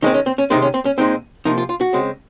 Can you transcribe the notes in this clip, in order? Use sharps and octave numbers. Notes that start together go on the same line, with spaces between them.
D#3 G#3 C4 D#4
C#4
C4
C#4
C3 D#3 G#3 C4 D#4
C#4
C4
C#4
A#2 G#3 C4 D#4
C3 F3 A#3 D#4
F4
F4
F#4
C#3 G#3 C4